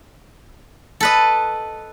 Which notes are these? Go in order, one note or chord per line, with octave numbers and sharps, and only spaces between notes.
A4 B4 D#5